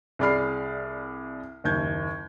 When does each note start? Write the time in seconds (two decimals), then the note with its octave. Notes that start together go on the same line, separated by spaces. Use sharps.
0.19 C2 G#4 D5 B5 F6 C7
1.64 F#1 D#2 G6 G#6